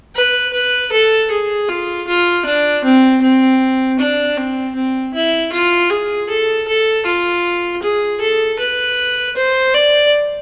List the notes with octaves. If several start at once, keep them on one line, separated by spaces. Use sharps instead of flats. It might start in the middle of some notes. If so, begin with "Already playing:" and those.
B4
B4
A4
G#4
F4
F4
D4
C4
C4
D4
C4
C4
E4
F4
G#4
A4
A4
F4
G#4
A4
B4
C5
D5